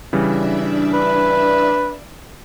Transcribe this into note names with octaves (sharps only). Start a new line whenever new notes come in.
C#3 E3 G3 D4 D5 E5
B4